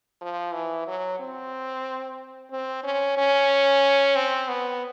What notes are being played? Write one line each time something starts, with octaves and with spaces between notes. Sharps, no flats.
F3
E3
F#3
C4
C4
C#4
C#4
C4
B3